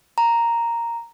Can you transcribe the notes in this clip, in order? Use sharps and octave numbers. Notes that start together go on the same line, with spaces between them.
A#5